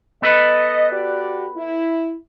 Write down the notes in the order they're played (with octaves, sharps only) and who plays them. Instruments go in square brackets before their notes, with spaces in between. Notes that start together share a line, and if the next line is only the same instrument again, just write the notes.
[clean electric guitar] B3 A4 B4 [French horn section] D#5
[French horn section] F#4 G4 D5
E4